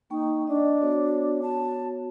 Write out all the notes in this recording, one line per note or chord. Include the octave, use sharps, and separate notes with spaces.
A#3 D#4 G5 C#6
D4 D#5
B3 F#4 C#5
A5